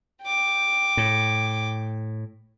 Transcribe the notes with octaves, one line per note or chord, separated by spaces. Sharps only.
G5 D6
A2